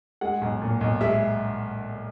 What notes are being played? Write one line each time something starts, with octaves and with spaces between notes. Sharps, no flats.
G#3 F#5
B1
A#2
B1
G#3 E5